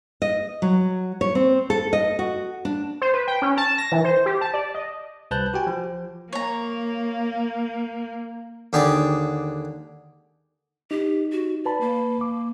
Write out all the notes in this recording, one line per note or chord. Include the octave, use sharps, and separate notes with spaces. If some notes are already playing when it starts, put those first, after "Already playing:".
D#5
F#3
C#5
C4
A4
D#5
F#4
D4
C5
B4
G5
C#4
A5
A#6
E3
C5
G4
A5
D5
D#5
C2 B4 A5 F#6 G6
F#4 G4 G5 G#5
F3
A#3 C#5 A#5
D#2 D3 G4 G#4 D5 D6
D#4 G4
F#4
B4 D5 A5 B5
A#3
D6